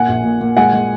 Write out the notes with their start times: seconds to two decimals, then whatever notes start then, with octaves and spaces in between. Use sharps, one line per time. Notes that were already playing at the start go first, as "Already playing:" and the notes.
Already playing: A#2 F#5 G#5
0.08 A#1
0.24 A#2
0.41 A#2
0.57 G#3 F#5 G#5
0.73 G#3